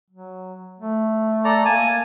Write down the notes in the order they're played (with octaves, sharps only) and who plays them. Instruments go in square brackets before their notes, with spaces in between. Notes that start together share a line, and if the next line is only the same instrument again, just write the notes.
[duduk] F#3
A3
[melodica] A4 D5 A#5
[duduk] A#3 [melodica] G#5 A5